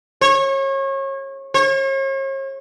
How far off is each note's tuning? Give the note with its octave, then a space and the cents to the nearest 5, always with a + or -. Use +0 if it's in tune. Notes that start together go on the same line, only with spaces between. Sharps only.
C#5 -30
C#5 -40